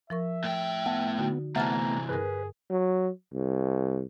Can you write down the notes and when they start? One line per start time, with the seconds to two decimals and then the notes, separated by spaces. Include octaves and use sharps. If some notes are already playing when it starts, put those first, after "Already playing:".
0.10 F3 A#4 E5 C#6
0.44 A2 G5
0.86 B3 A5
1.18 D3 D#4 F#4
1.56 C3 E3 A3 B3 A5 A#5 F6 A6
2.09 G2 G#4 A#4 B4
2.70 F#3
3.34 C2